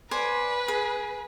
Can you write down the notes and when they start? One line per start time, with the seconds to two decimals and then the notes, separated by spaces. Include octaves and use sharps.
0.11 B4 C5 D5 G#5
0.68 G#4